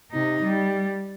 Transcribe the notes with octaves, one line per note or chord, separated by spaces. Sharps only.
C3 D#4
G3